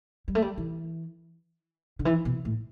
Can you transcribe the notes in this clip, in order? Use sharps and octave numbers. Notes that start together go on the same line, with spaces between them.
G3
A3
G3
E3
D3
E3
B2
A2